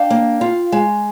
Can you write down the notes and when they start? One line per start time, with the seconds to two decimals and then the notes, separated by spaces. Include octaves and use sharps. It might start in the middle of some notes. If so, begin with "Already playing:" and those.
Already playing: D4 F5 G5
0.10 A#3
0.41 F4
0.72 G#3